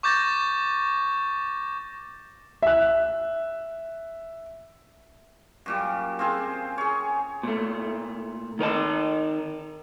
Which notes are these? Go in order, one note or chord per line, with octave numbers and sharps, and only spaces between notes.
C#6 D6 G6 A6 A#6
E5 F#6
F#2 A#2 G3
C4 F4 G#4 C5
G#4 C#5
A#2 A3
D#3 A#4 D#5 A5